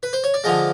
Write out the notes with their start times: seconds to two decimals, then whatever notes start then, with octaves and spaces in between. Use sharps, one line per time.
0.03 B4
0.13 C5
0.24 C#5
0.34 D5
0.44 D3 F3 G#3 D#5